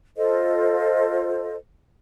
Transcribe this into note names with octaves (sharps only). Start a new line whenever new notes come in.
F4 A4 C5 D#5